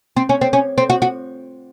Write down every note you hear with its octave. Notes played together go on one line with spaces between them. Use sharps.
C4
C#4
C4
C#4
C4
F#4
F#4